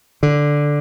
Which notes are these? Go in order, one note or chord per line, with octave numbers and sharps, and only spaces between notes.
D3